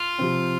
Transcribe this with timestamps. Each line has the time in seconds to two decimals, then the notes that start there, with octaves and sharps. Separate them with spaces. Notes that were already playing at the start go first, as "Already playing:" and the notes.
Already playing: F4
0.19 C3 F3 C4